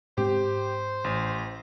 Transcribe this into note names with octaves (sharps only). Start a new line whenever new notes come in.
G#2 C4 G4 C5
A1